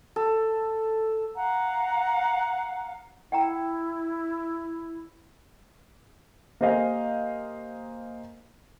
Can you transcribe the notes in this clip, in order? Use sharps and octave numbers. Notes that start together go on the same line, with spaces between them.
A4
F5 F#5 A#5
E4 F#5 G5 A#5
A#3 G4 C5 D#5 F5 G#5